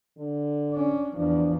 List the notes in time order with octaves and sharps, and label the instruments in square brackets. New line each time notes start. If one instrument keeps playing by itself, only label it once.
[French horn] D3
[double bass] C#4 D4
[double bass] E2 F3 [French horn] D4